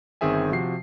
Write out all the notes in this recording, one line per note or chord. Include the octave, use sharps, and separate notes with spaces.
G1 D#3 C4 G#4 E5 G#5
C3 F3 F#4 C7